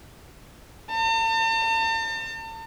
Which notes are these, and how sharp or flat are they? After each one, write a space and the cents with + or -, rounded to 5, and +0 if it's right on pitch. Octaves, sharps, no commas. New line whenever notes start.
A5 +45